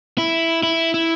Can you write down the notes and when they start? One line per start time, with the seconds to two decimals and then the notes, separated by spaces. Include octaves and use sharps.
0.18 E4
0.63 E4
0.94 E4